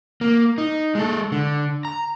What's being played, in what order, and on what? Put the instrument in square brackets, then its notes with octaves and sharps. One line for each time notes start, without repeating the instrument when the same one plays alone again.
[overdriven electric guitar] A#3
D#4
G#3 A4
D3
A#5